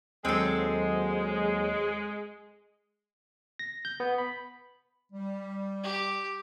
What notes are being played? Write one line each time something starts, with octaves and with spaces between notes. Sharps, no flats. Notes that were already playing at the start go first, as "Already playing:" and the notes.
D#2 F#3 G#3 C4 A4 C5
A#6
G6
B3
B5
G3
G4